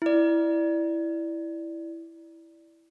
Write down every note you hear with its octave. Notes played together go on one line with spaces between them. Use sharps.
E4 D5